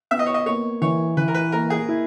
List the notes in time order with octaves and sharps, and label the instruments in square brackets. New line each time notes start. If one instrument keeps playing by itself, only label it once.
[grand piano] B3 [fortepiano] E5
[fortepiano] D#5
C#5
D#5
[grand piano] A#3 [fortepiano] C#5
[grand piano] E3 [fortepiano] C#5
[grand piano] E3 [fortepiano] B4
[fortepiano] A#4
B4
[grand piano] A#3 [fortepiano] A#4
[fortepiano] G#4
[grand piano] E4